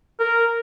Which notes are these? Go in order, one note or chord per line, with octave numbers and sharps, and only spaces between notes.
A#4